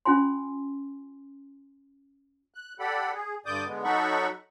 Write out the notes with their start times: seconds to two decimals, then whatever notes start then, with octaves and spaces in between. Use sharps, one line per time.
0.05 C#4 F4 G#5 C6
2.54 F#6
2.79 G4 A4 D5 F#5 B5
3.14 G#4
3.46 G2 D3 D5 D6 D#6 G6
3.67 D3 G#3 B3
3.84 F#3 D#4 A4 F#5 B5 C#6